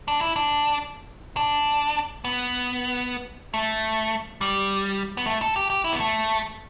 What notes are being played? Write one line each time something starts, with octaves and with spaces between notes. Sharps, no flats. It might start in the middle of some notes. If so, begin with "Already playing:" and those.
D4
E4
D4
D4
B3
A3
G3
B3
A3
A4
G4
G4
E4
B3
A3